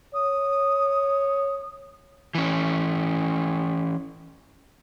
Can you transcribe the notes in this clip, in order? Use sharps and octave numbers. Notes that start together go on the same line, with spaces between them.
C#5 D#6
E3 C#4